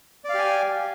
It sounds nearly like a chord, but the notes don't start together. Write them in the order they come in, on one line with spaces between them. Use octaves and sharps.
D5 F5 G4 G#5